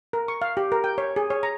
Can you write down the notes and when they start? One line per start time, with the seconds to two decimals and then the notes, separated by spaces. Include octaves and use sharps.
0.13 A#4
0.28 C#6
0.42 F5
0.57 G4
0.72 A#4
0.84 G5
0.98 C#5
1.16 G#4
1.30 C#5
1.43 A#5